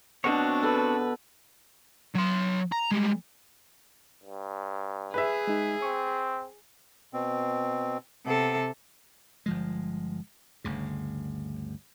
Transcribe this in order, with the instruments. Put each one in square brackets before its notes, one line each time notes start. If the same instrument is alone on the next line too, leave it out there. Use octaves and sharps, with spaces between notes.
[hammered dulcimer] B2 [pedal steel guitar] C4 F#4 C#5 [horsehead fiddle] D4
[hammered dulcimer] A4 [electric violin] B4
[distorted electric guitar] F#3 C6
A#5
G3 G#3
[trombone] G2
[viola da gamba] G#4 [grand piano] B4 E5
[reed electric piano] G#3 D#4
[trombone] C4 [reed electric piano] C#6
[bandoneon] B2 C4
[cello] C3 A4 [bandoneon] B3
[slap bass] G1 F3 G#3
G1 D2 C#3